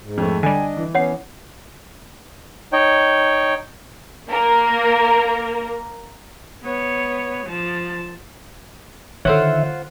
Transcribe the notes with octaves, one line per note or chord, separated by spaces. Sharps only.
G#2
F2 A3
D3 G3 D4 D#5 G#5
E3
B3 C#4 C#5 F#5 C7
D#4 C#5 G5
A#3 A#4
B3 C#5
F3 A5
D3 D#3 F4 A4 C5 C#5 E5 F#5